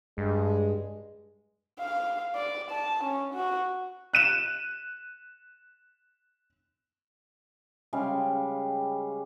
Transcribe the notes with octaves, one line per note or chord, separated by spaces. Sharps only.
G2 G#3
F5
D5
A5
C#4
F#4
F#6 D#7 E7
C#3 G3 G#3 F5